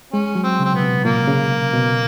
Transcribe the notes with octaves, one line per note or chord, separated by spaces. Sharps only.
G#3 C#4
F#3
C4
C#3 C4
B2 B3
C3
A#2 A#3
C#3
B2